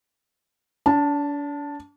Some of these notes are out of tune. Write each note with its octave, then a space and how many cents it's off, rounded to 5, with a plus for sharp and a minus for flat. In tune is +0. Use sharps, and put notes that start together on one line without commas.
D4 -40 A5 +5